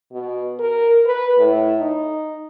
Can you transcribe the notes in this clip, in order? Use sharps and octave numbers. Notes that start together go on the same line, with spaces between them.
B2
A#4
B4
A2
D#4